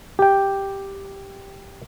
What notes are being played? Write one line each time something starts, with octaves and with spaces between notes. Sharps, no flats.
G4 G5